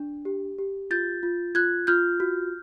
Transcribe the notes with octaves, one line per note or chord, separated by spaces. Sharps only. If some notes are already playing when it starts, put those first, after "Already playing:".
Already playing: D4
G4
G4
F4 G6 A6
F4
F4 F#6 G#6
F4 F6 G6
F#4